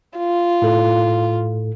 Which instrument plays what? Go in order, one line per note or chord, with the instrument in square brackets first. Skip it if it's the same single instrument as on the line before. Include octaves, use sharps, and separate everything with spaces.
[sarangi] F4
[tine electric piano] A2 A4